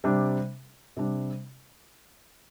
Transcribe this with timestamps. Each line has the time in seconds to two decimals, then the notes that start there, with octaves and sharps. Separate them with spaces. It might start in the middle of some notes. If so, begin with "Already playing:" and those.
0.04 C3 G3 D4
0.97 C3 G3 D4